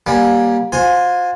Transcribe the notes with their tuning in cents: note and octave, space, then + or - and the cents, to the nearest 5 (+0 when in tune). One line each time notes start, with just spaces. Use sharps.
G3 +0 A#3 +25 C#4 +0
F4 +35 C5 +0 G#5 +0